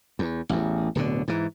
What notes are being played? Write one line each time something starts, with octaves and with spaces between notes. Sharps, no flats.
E2
A1 E2
D1 B2 D3
G#2 E3